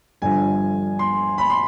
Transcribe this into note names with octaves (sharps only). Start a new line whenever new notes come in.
G1 G2 D3 F3 G#5
C6
B5
C6